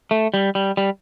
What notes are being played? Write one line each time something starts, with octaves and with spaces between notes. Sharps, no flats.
A3
G3
G3
G3